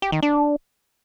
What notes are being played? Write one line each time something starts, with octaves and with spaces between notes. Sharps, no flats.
G4
D#3
D4